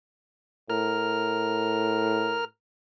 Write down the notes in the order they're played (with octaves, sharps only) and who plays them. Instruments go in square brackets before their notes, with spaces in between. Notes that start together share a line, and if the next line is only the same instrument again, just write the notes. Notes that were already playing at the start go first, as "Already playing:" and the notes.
[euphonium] A2 [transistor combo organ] A#4 F6